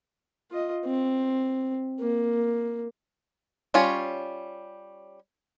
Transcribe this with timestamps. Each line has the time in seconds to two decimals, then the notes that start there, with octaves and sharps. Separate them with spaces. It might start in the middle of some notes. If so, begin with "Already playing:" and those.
0.51 F4 D#5
0.85 C4
2.00 A#3
3.74 G3 C#4 F4 C#5